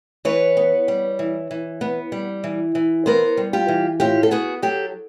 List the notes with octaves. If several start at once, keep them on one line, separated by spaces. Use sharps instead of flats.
E3 B4 C#5
B3
G3
E3
E3
B3
G3
E3
E3
B3 A#4 C5
G3
F4 G4
E3
A2 F4 G4
A4
B3 F#4 G#4
F#3 G4 A4